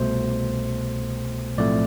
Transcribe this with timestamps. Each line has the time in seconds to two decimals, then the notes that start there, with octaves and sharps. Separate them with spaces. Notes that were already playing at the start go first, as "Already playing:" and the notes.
Already playing: C2 B2 A3 C5
1.58 B1 A2 F3 A3 C4 D5